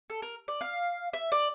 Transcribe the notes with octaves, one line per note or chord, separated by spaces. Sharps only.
A4
A#4
D5
F5
E5
D5